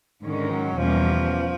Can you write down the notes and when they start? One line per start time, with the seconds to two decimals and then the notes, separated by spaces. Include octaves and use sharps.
0.23 G#2 D3 D#3 G#3 C#4
0.51 F#3
0.78 E2 B2 F3 G3 A#3 C#4